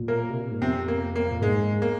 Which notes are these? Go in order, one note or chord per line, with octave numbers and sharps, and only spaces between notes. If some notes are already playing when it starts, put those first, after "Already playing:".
Already playing: A#2
A#3 A#4
C3
A#2
G#2
F2 C3 C4
A#3
A#3
A#2
G#2 G#3
A#3